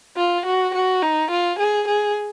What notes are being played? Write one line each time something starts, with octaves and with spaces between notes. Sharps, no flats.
F4
F#4
F#4
D#4
F4
G#4
G#4